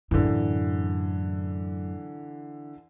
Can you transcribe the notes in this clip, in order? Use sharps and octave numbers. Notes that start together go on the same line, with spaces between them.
F#2 A2 D3 E3